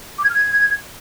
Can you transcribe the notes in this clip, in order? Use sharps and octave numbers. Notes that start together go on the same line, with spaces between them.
D6
G#6
F6
G#6